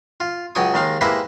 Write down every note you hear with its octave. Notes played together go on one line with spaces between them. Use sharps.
F4
C#2 F#3 G5 G#5 C#6 D#6
D#2 D#3 G#3 F5
G#3 A#3 E4 G4 B4 C5